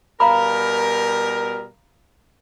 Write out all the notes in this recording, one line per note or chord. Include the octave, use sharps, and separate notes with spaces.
B2 G3 A#4 F5 A#5 B5